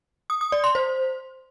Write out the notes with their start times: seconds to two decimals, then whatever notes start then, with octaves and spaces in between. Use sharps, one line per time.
0.30 D#6
0.41 D#6
0.52 D5
0.64 C6
0.75 C5